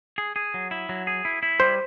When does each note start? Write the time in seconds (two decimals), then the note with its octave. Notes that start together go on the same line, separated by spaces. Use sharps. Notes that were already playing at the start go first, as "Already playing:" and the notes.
0.18 G#4
0.36 G#4
0.54 F#3
0.71 E4
0.89 F#3
1.07 G#4
1.25 E4
1.43 E4
1.60 G3 C5